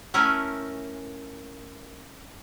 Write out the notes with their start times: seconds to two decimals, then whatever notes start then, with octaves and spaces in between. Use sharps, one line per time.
0.14 A3 C#4 E4 A#4 B4 G#5